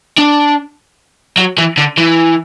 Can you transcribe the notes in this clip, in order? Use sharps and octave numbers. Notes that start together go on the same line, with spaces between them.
D4
F#3
E3
D3
E3